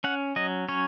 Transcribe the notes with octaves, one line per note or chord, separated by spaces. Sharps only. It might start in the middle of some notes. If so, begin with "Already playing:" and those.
C#4 F#5
F#3 D#5
C#4 C#5